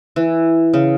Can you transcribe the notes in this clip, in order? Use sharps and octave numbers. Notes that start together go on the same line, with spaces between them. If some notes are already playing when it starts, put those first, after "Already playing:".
E3
C#3